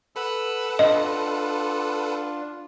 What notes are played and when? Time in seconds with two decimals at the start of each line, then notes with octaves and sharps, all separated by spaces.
0.16 A4 B4 F#5 B5 E6
0.79 D4 F4 D#5